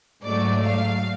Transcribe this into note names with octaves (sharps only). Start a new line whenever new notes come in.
G#2 F#3 A3 D5
F5